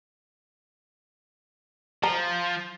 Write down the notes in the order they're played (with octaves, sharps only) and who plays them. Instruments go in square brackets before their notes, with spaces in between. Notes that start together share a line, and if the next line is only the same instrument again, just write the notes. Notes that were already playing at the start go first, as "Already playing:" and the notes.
[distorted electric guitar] F3 [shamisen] A#5